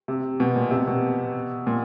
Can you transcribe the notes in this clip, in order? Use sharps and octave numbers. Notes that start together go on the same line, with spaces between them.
C3
B2
A#2
C3
B2
A#2